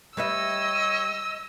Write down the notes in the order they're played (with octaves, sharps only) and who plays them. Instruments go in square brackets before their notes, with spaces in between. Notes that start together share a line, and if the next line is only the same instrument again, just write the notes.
[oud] G3 B4 E5 [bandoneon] C#5 [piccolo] D#5 [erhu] E6